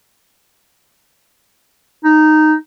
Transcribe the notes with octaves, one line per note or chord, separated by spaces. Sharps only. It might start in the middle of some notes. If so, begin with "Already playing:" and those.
D#4